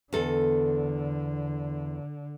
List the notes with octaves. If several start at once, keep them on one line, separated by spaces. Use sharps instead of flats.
E2 D3 A4